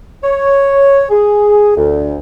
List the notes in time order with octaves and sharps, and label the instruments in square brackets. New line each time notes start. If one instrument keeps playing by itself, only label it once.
[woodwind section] C#5
G#4
D2